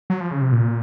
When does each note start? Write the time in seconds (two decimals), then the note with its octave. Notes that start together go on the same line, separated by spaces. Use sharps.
0.10 F#3
0.21 F3
0.31 C#3
0.42 C3
0.52 A#2